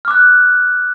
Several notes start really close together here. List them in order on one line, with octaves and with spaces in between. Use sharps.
F6 D6 F#6